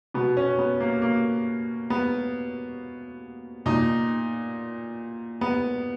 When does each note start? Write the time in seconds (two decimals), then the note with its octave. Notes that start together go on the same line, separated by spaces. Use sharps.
0.14 B2 B3
0.37 C#4
0.58 B3
0.80 A#3
1.02 A#3
1.90 B3
3.66 A#2 D#4
5.41 B3